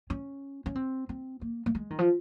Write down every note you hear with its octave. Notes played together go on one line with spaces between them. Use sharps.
C#4
C#4
C4
C4
A#3
A#3
G#3
D#3
F3